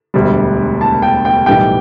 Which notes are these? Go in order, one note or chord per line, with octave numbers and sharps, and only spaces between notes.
E1 D2 D3 G3
A5
G5
G5
B1 A2 E3 G3 G5